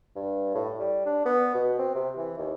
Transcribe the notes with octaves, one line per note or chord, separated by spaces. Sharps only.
G2
A2
G3
D4
B3
B2
C4
C3
E3
D#2